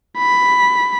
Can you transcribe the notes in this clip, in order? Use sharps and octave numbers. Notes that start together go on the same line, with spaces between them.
B5